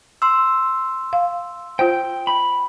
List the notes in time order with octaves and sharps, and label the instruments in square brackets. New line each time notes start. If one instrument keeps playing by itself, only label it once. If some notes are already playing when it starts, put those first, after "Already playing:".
[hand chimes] C6 E6
[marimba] F5
[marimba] F4 C5 [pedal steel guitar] G5
[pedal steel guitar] B5